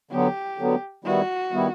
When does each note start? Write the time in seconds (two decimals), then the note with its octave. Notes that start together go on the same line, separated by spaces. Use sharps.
0.11 D3 F#3 B3 G4
0.58 D3 F#3 B3
1.04 D#3 G3 B3 E4 F#4
1.52 D#3 G3 B3 E4